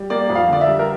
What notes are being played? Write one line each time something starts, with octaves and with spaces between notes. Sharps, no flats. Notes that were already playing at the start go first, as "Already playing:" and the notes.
Already playing: G3
A#3 D5
F2
F5
D3 D5
E5
G3
A#4